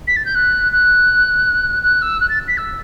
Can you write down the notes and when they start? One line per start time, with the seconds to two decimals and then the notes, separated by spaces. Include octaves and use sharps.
0.07 B6
0.16 A6
0.25 G6
0.35 F#6
0.72 F#6
1.82 F#6
2.01 E6
2.20 F#6
2.29 A6
2.48 B6
2.57 E6